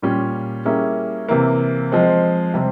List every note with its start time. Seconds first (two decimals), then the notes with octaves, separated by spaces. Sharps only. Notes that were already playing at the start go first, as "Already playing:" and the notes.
0.02 A#2 G3 C#4 F4
0.65 G3 A#3 C#4 E4 G#4
1.29 C3 E3 A#3
1.92 F3 G#3 C4
2.54 C3 G3 C4